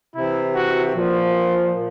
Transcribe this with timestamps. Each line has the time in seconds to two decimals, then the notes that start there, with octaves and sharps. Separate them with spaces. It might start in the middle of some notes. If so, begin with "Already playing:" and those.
0.15 C3 E3 E4
0.54 F#4
0.94 A#2 F3